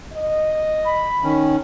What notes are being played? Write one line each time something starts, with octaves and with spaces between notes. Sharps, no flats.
D#5
B5
D#3 C#4